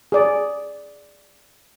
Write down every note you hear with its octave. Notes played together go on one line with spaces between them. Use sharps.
G#4 D5